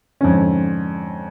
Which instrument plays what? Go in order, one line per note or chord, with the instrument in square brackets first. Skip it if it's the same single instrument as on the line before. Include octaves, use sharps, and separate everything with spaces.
[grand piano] F2 G#2 D3 C#4